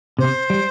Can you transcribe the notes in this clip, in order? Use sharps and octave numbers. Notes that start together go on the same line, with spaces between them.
C3 C5
G3